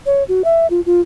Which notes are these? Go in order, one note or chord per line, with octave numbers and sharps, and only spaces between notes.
C#5
F#4
E5
F4
F4